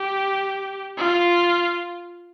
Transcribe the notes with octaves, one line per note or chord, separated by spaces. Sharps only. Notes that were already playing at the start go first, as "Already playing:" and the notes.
Already playing: G4
F4